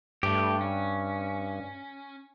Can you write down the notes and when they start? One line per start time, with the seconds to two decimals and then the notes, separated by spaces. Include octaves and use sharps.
0.23 G2 A3 G4
0.61 C#4